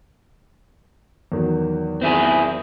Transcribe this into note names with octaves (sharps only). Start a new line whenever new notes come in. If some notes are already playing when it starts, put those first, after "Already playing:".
E2 D#3 F#3
C4 E4 G#4